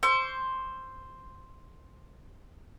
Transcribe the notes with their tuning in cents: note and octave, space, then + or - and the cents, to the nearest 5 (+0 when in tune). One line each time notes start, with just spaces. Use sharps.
C5 +0 C#6 +40 E6 +30